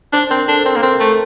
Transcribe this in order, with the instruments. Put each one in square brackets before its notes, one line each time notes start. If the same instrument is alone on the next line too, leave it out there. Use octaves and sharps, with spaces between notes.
[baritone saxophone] D4 [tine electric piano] C5
[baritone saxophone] C4 [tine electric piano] A#4
[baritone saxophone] D4 [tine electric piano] A4
[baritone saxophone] C4 [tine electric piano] A#4
[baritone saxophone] A#3
[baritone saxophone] C4 [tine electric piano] A#4
[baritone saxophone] A3 [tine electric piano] A4